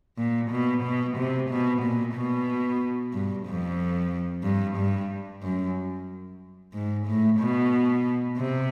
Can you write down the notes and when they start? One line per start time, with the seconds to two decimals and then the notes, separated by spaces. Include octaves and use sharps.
0.18 A#2
0.51 B2
0.83 B2
1.17 C3
1.50 B2
1.82 A#2
2.15 B2
3.13 G2
3.47 F2
4.44 G2
4.77 G2
5.43 F#2
6.74 G#2
7.07 A2
7.40 B2
8.38 C3